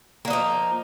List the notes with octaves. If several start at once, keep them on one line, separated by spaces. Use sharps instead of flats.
D3 F3 A#3 D#4